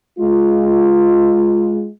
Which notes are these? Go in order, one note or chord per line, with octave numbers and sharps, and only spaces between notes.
G#3 F4